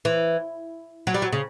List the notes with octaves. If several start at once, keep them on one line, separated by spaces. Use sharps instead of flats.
E3
F#3
G3
F#3
C#3